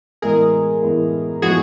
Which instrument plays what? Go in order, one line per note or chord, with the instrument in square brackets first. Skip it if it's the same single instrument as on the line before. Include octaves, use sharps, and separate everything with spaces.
[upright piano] A2 E3 G#3 B3 [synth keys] G#4 A#4
[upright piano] A2 E3 G#3 B3
[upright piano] A2 F3 G#3 B3 [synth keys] F#4 G#4